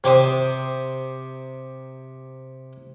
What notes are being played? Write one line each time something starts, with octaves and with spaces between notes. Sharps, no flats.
C3 G4 C5 D#6